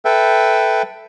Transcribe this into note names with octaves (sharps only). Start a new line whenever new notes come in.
A4 B4 E5 G5